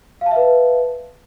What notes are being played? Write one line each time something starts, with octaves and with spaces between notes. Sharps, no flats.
B4 E5 F5 A5